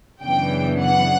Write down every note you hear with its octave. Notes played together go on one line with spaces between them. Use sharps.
F#2 C#3 E3 B3 D4 G5
F#5